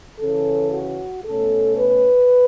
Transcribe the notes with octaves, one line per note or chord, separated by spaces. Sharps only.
C#3 E3 C#4 A4
F#4
B2 A3 C#4 A4
B4